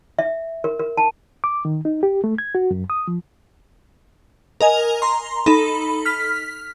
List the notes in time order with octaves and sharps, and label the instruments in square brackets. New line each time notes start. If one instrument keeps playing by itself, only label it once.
[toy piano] E5
A#4
A#4
A5
[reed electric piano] D6
D#3
D#4
G4
A3
G#6
F#4
F#2
D#6
F3
[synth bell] A#4 D#5 G#5 F7
A#5 C6
D#4 A4 B5
F6 B6